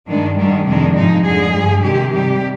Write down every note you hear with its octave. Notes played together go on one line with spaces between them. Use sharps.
G2 D#3 G#3 D4
G#2 D#3 G3 D4
F2 C3 D#3 G#3 D4
G#2 F3 G#3 D#4
F2 D3 G#3 G#4
G2 D3 F3
C3 D#3 G#3 G4
C3 G3 G4